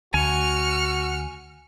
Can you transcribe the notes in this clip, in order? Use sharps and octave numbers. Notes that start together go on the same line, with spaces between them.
D2 F#4 G#5 F6 C#7